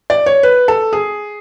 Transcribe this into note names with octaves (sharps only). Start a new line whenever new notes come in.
D5
C#5
B4
A4
G#4